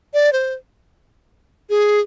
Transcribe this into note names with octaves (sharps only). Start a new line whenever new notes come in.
D5
C5
G#4